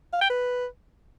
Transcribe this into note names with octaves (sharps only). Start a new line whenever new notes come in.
F5
G5
B4